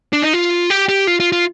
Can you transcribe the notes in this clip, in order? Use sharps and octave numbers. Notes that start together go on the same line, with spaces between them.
D4
D#4
F4
G4
G4
F4
F4
F4